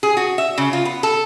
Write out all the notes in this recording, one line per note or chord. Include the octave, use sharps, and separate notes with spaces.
G#4
F#4
E5
C#3
F4
B3
A4